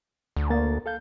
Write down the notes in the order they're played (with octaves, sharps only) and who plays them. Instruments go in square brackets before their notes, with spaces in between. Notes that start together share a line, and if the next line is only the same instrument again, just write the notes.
[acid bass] D2
[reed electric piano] A#3 A6
A4 F5 G6